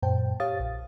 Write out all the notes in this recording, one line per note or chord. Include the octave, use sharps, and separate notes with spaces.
F#2 A#2 C5 G5 A5
G4 C#5 F5 D#6 A6
A#1